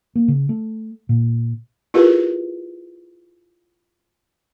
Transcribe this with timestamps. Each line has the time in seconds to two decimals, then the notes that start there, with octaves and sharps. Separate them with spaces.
0.15 A#3
0.28 C#3
0.49 A3
1.09 A#2
1.94 E4 F4 G4 G#4 A#4 B4